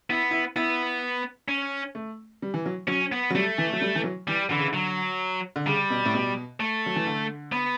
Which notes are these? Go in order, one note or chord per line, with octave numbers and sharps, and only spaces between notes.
B3 E4
E4
B3 E4
C#4
A3
G3
E3
F#3
F#3 C#4
B3
F#3
G3 A3
E3
F#3
G3
E3
F#3
E3 G3
D3 E3
C#3
D3
F#3
D3
C#3 G3
B2
A2
B2
A3
F#3
E3
D3
B3